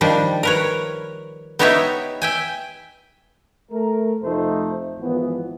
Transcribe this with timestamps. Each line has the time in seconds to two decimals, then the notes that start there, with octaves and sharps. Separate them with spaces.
0.01 D#3 F3 G3 D4
0.43 A#4 B4 C#5
1.59 B3 D#4 G4 C#5 D#5 E5
2.22 E5 G5 G#5
3.72 A3 A#4
4.23 F2 C3 F3 A3 D#4 C5
5.00 G#1 E3 F3 B3